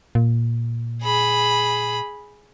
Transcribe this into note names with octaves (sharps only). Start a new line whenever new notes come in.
A#2
G#4 B5